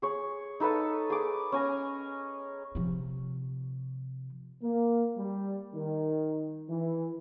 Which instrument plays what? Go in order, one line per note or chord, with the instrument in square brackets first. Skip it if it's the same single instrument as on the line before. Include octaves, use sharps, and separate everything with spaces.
[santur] G#4 C#5
D#4 A4 B4 A5
G#4 D6
C#4 G#5 A#5
[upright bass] C3 F3
[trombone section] A#3
G3
D#3
E3